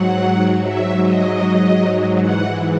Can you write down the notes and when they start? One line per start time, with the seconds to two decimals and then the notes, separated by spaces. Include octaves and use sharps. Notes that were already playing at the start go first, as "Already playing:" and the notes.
Already playing: G#2 F#3 F#5
0.63 E5
1.02 D#5
2.18 G#2 E3 F#5